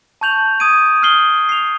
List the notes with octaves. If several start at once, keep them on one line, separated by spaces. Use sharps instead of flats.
A5 C#6 G6 F7 F#7
D#6 G#6 D7 D#7
D#6 F6 G6 C7 F#7 G7
C7 F7